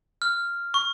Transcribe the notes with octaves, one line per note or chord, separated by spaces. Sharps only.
F6
C#6